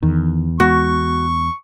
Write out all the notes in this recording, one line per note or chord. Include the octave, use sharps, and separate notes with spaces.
E2 D#3
G#3 B3 F#4 C#6